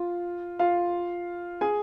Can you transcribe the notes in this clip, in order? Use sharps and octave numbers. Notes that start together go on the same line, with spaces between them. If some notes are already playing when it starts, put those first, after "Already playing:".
Already playing: F4
F4 F5
G#4 G#5